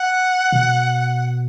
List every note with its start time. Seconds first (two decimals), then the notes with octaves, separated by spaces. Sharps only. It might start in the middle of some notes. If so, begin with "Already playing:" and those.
Already playing: F#5
0.52 B2